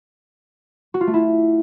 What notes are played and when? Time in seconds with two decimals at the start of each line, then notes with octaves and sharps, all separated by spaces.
0.94 F#4
1.01 F4
1.07 A3
1.14 E4